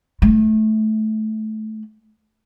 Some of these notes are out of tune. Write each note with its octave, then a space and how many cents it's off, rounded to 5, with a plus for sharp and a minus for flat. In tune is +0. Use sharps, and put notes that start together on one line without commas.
A3 -20